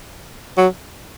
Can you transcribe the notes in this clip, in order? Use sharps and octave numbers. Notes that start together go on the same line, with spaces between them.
F#3